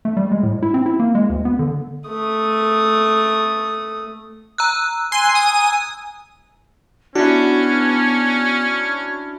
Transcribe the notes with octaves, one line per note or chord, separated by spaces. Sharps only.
A3
G3
G#3
A2
E4
C4
E4
A#3
G#3
D2
B3
D3
A3 D#6
A#5 E6 F#6
G#5 C6
D#6
B3 C#4 D4 E4 F#4